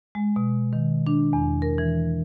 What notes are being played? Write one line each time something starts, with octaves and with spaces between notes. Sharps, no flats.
G#3
B2
D#3
D4
E2
A#4
E3